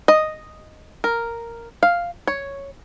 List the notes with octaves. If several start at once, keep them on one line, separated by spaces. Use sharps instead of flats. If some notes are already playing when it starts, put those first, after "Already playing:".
D#5
A#4
F5
C#5